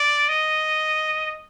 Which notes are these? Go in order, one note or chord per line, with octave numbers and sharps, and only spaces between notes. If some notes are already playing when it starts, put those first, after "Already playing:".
Already playing: D5
D#5